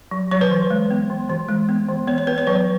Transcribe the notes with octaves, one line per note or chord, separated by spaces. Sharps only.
F#3
F#3 C#5
B4
E3
G#3
B3
E3
E3
G#3
B3
E3
B3 C#5
C#5
B3 B4
C#5
F#3 B4